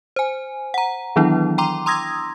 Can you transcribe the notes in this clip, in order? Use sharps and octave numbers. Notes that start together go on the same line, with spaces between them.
C5 G#5
F#5 A#5
D#3 E3 F#3 B3 D4 E4
G5 A#5 C6 D6
A#5 C6 D#6 E6 G#6 A#6